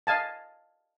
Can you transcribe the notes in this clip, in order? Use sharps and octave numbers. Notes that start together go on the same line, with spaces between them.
D#5 F5 G#5 A5